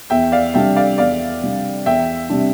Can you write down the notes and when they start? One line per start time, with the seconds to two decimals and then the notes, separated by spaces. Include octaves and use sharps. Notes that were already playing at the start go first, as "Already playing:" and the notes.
0.10 E2 E5 G5
0.32 D5 F5
0.54 C3 G3 D4 E5 G5
0.76 D5 F5
0.98 E2 D5 F5
1.43 C3 G3 D4
1.86 E2 E5 G5
2.30 C3 G3 D4